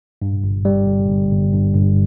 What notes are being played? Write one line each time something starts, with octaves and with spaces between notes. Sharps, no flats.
G2
G1
G3
G1
G1
G1
G2
G1